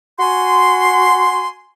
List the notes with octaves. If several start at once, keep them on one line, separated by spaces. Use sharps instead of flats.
F#4 G#5 C6